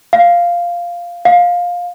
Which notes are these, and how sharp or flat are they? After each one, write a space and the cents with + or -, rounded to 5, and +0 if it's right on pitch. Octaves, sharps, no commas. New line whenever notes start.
F5 -5
F5 +15